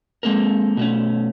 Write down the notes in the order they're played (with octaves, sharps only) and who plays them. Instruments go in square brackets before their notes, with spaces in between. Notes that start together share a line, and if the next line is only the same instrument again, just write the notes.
[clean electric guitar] G#3 A#3 C4 A4 A#4
B2 A3 C#4